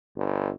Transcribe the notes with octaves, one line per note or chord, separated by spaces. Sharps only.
G1